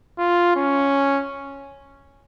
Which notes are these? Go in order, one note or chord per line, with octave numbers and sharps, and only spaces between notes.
F4
C#4